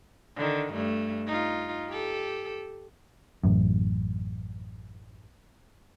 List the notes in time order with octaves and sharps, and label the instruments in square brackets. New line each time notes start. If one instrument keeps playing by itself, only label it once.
[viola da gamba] D3 D#3
G2 A3
D#4 F4
G4 A4
[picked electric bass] A1 F#2